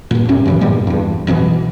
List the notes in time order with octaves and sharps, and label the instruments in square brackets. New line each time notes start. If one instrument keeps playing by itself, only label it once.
[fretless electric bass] G2 A#2
C2 F#2 C3 C#4
F#2 C#3 E3
G2 A#2 G3 B3
E2 G2
B1 F2 B2 E3